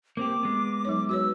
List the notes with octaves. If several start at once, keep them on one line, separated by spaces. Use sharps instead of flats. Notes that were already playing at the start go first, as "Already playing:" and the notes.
A#3 C4 G4 D6
G#3 B3
F#3 D#4 C#5
F#4 B4 C#5 E6